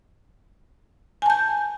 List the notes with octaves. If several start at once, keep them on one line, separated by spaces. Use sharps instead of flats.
G#5 A5 G6